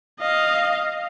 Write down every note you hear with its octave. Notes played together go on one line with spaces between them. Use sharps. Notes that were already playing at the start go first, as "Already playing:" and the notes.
D#5 F5